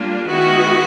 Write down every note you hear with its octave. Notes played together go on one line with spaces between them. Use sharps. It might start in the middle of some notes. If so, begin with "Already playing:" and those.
Already playing: G3 A#3 D4 F4
D#3 G#3 B3 E4 F#4